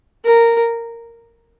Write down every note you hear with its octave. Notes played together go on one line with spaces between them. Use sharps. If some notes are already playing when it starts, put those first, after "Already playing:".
A#4